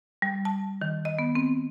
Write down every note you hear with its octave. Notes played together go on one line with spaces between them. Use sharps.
G3
A5
D#3
D#5
B3
C4